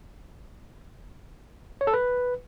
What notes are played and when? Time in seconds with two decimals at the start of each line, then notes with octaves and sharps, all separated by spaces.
1.81 C#5
1.87 A4
1.93 B4